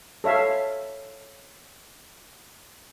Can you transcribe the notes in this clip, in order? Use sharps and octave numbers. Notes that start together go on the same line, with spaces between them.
A4 C#5 E5 F5